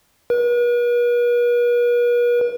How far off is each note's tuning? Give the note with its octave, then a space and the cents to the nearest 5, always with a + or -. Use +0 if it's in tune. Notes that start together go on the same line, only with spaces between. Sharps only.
B4 -45